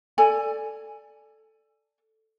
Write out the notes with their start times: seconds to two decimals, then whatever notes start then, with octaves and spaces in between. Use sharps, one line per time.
0.18 A4 D5 G#5